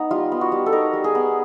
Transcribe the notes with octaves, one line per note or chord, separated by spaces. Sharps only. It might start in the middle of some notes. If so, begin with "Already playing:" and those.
Already playing: B3 D#4
G3 F4
B3
F#4
G3
A4
D#4 A#4
G3
G#4
B3